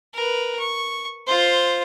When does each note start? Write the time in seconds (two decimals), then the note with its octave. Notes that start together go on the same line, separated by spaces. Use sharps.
0.14 A#4 B4
0.59 C#6
1.27 F4 C5